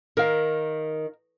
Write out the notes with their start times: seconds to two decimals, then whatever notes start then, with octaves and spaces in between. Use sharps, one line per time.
0.17 D#3 A#4 F5